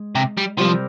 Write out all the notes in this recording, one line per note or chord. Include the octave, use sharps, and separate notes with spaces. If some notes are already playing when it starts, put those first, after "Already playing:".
Already playing: G#3
C3
G3
C3 F3 G3 C4 G4 A#4